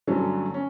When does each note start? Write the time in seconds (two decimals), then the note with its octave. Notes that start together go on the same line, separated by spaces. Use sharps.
0.07 G2 D3 F#3 A3 C#4
0.54 C#4